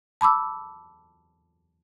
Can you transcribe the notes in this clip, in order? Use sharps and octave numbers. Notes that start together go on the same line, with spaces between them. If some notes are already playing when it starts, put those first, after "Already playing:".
A5 B5 D6 E6